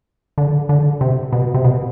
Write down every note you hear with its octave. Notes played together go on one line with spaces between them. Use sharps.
D3
D3
C3
B2
C3
B2